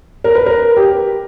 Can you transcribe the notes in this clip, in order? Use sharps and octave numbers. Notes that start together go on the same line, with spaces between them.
A#4
B4
A#4
G4